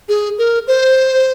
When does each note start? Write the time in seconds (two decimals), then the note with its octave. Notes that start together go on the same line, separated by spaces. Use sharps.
0.09 G#4
0.38 A#4
0.68 C5